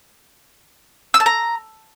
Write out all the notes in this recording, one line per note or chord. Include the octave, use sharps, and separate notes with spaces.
E6
A5
A#5